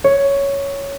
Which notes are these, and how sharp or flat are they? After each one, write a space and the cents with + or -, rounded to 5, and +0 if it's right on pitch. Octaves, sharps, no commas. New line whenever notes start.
C#5 +5